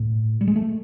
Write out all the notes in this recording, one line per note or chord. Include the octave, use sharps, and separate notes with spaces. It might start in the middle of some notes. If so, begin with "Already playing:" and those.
Already playing: A2
G3
G#3
A3